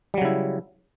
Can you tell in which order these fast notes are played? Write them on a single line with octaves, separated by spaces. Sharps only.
G3 F#3 C#3 E4